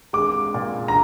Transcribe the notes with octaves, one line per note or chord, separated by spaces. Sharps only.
G#3 D6
A#2
A#5